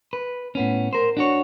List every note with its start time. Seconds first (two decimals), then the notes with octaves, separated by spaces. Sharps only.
0.13 B4
0.55 A2 B3 C#4
0.93 A#4 C5
1.17 D4 F#4 C#5